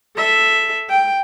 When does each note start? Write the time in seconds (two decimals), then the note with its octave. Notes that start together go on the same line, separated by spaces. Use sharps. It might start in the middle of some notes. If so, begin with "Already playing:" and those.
0.16 A4 E5
0.90 G5